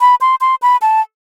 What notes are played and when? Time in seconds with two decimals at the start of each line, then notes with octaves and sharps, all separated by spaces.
0.01 B5
0.21 C6
0.41 C6
0.62 B5
0.82 A5